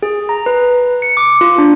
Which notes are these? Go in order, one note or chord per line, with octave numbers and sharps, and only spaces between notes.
G#4
A#5
B4
C#7
D6
F4
D4